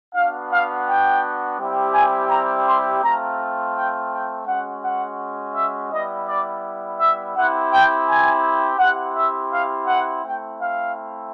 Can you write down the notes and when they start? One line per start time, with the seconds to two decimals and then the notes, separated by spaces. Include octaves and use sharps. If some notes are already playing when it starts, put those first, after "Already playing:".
0.14 B3 D4 F#4 F5
0.51 F5
0.87 G5
1.59 G3 C4 E4 G4
1.94 G#5
2.30 A#5
2.67 C6
3.02 A3 C4 F4 A#5
3.74 G5
4.11 G5
4.47 G#3 C#4 F#4 F#5
4.83 F#5
5.55 E5
5.91 G3 B3 E4 D#5
6.27 D5
6.99 E5
7.35 C4 E4 G4 F#5
7.71 G5
8.08 G#5
8.79 C4 E4 G4 F#5
9.15 E5
9.51 F5
9.87 F#5
10.23 A3 C4 E4 G5
10.59 F5